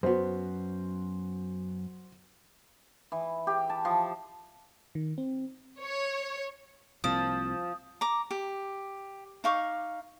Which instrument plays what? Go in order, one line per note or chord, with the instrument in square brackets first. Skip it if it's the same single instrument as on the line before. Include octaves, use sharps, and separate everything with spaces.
[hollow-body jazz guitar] F#2 B3 [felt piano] F#4 C5
[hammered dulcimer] E3
G4
A5
F3
[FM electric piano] D#3
C4
[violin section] C#5
[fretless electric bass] C2 C3 A#3 [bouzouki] F3 [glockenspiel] D#6
[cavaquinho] A#5 D6
G4
D#4 F5 C#6 D6